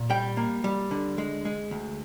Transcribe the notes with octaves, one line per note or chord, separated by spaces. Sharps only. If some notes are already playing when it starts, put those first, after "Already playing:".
Already playing: A#2
G3 G5
A#3
G3
D3
G#3
G#3
D2